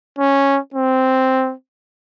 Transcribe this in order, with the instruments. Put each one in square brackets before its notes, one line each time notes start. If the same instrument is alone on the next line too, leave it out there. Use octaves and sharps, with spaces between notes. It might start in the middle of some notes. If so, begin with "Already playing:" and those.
[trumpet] C#4
C4